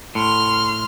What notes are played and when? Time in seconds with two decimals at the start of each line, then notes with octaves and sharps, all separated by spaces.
0.15 A2 C6 F6